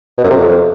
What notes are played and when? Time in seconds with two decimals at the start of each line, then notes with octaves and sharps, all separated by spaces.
0.18 B2
0.24 F#2
0.30 C3
0.36 F2